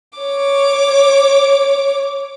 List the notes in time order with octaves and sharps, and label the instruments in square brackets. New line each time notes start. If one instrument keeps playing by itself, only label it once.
[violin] C#5 D6